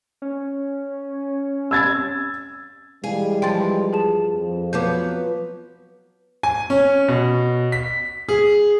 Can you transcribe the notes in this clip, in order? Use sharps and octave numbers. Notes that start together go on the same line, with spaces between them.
C#4
E6 G#6 A6
E3 G3 G#3 G#4 F5
G2 F3 G5 C6 A6
G#4 A5 E7
F2
F3 F#3 B3 D6 G6
G#5
C#4
B2
B6
G#4